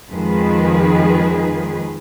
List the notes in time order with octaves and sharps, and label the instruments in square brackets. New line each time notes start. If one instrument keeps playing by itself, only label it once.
[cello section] F2 D#3 F3 G#3 G#4 B4